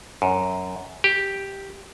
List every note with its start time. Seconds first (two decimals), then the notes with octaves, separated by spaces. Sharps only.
0.22 F#2
1.04 G4